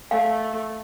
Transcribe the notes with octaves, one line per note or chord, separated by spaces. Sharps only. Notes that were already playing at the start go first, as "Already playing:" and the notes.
A3 F5